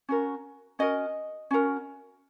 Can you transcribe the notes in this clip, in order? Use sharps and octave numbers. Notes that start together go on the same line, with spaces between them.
C#4 F#4 A#4
C#4 F#4 A#4 D#5
C#4 F#4 A#4